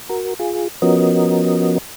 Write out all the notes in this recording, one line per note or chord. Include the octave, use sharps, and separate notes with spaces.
F#4 A#4
F4 G#4
F3 B3 C#4 F#4 A#4 D#5